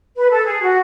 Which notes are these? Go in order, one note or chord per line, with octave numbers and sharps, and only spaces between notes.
B4
A4
G#4
F#4